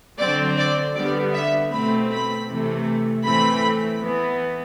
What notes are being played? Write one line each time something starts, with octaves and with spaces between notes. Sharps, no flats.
D3 F#3 C4 D5
D5
D3 G3 B3 D5
E5
B2 A3 C4 B5
B5
C3 E3 A3
A2 E3 A3 C4 B5
E3 B3